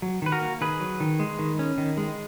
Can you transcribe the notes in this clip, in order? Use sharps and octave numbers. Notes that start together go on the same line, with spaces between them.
F#3
D#3 B4
F#4 A#4
A#3
D#3 G#4 B4
F#3
D#3
G#3
D#3
C#4
D#3
G#3